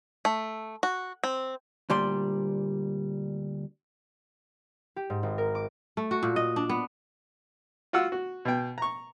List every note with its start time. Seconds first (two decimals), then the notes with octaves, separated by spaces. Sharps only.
0.25 A3
0.83 F#4
1.24 C4
1.90 D2 A#2 G3 D5 C6
4.96 G4
5.10 G#2
5.23 G#1
5.38 A#4
5.55 D6
5.97 A3
6.11 F#4
6.23 A#2
6.36 D#5
6.56 D4
6.69 B3
7.93 F4 F#4 F#5 E6
8.12 F#4
8.45 B2 G5
8.78 A#5 C#6